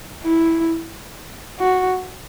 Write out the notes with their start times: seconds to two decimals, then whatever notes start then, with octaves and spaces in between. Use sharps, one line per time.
0.24 E4
1.59 F#4